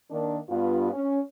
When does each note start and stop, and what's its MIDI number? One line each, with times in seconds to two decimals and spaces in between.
0.11 0.38 51
0.11 0.38 58
0.11 0.38 62
0.49 0.90 43
0.49 0.90 59
0.49 0.90 65
0.92 1.19 61